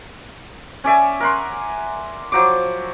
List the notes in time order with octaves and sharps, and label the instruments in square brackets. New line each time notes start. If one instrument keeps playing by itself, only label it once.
[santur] C#4 D5 E5 G#5
A#4 F#5 C6
F3 F#3 D6